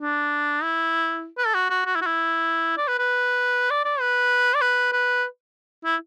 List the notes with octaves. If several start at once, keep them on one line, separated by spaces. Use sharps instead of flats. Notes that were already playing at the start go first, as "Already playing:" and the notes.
D4
E4
B4
A4
F#4
F#4
F#4
E4
F#4
E4
D5
B4
B4
D5
D5
B4
D5
B4
B4
E4